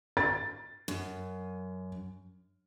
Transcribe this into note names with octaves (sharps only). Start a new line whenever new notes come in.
A6
F#2